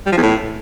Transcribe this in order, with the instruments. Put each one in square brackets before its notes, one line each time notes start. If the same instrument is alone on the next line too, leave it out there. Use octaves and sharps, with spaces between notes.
[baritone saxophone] G3
F3
E2
A2